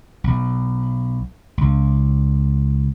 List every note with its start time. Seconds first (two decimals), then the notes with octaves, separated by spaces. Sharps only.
0.24 B1
1.58 C#2